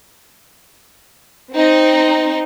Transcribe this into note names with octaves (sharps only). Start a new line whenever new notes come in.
C4 D#4